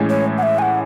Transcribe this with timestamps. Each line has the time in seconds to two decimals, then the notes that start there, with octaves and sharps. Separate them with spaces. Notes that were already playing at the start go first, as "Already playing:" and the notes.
Already playing: A2 E3 G#3 C#4
0.09 C#5
0.38 F#5
0.43 E5
0.59 G#5
0.62 F#5